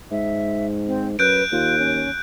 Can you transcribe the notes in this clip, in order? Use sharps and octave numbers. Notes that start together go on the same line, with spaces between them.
G#2 E5
C4
F#2 B4 F#6 G6 D7
D#2 F4
C#4